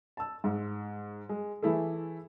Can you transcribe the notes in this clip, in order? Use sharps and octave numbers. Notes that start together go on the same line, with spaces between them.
A5 E6
G#2
G#3
E3 A3 E4 G#4 A4